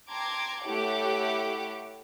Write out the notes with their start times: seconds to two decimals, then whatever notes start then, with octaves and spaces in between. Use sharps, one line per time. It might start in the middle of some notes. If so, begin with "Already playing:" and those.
0.11 G5 A5 A#5 C6 D6 G#6
0.63 A3 E4 G4 C#5 F#5 D6